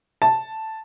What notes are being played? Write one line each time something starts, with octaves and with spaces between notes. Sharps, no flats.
A5